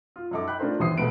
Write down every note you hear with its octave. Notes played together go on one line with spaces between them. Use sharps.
F4
F#2 F#3 D#4 A4 D6
G5 B5 F#6
A3 D4 F4 A#4 C5
G1 D#2 E3 C5 D#6 C7
E1 B1 A3 B3 B4 D7